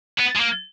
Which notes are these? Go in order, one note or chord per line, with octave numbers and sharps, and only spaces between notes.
B3
G#3
A#3